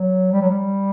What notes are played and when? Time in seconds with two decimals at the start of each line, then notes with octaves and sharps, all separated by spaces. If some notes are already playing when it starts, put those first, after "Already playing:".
Already playing: F#3
0.32 G3
0.41 F#3
0.50 G3